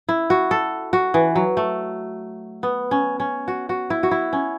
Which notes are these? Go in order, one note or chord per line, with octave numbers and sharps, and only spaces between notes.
E4
F#4
A4
F#4
E3
F#3
A3
B3
C#4
C#4
F#4
F#4
E4
F#4
E4
C#4